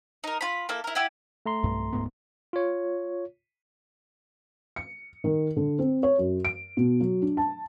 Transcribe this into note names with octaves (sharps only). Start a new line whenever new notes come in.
D#4 A#4
F4 B5
A#3 E4 A4
E4 A#4
E4 G4 F#5 G#5
A3 A#5 C6
B1 G2
D1 G#2 B3
F4 C#5
C#7
D#3
D3
C4
C#5
F#2
D7
B2
F#3
D4
A5